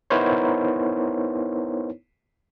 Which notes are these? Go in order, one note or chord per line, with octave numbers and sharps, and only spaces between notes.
B3 D#4 E4 A#4 C5 C#5